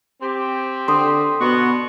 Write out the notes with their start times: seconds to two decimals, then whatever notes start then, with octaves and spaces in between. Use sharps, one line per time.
0.21 C4 G4
0.88 D3 C6 D#6
1.40 B2 B3 D4 F#4